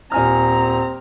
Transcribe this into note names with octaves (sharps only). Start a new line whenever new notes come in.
D#1 C4 G#5 A#5 F6